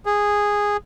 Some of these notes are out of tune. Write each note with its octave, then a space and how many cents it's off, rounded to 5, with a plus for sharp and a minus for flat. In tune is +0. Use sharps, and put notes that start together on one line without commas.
G#4 -10